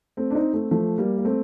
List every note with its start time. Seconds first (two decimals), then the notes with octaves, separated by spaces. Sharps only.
0.17 A3 C4
0.31 D4
0.35 C4 D#4
0.53 A3 C4
0.71 F3 A3
0.98 G3 A#3
1.18 A#3
1.25 A3 C4